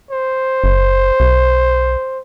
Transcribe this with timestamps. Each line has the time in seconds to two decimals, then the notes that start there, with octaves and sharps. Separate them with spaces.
0.11 C5
0.64 F#1
1.20 B1